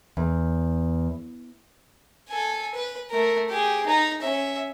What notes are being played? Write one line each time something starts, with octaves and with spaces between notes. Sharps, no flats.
E2
A4 G#5
B4
A3 A#4
G4 G#4
D#4 A#5
C#4 E5